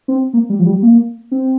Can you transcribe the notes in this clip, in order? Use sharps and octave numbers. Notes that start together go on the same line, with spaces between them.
C4
A#3
G3
F3
G3
A#3
C4